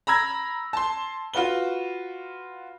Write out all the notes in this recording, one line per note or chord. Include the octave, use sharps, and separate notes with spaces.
A#5 B5 E6 G#6 A#6
A5 C6
F4 F#4 B4 G7